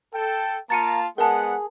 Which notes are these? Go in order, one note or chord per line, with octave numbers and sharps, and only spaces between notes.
A4 G5
A#3 F4 A5 A#5 A6 C#7 D#7
G#3 B3 G#4 A#4 F#5 A5